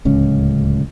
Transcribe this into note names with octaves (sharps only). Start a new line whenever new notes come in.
D1 C#2 C#4